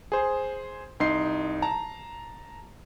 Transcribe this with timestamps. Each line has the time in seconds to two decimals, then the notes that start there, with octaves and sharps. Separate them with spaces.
0.12 G#4 C5
1.00 C2 D#4 C6 C7
1.62 A5 A#5